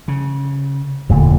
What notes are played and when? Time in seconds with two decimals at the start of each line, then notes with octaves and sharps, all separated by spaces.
0.08 C#3
1.09 E1 F2 A#2 D3 A3